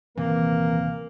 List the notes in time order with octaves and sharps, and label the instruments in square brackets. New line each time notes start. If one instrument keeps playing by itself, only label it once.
[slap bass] D#1 C3 C4 [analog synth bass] E3 [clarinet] A#3 [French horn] A#4